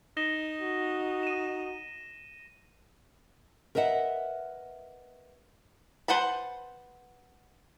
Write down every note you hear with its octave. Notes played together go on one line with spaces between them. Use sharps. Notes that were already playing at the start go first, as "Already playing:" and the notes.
D#4 A#6 E7 G7
F#4
D#7 E7
A#4 B4 D#5 E5 F#5
B4 C5 F#5 A5 B5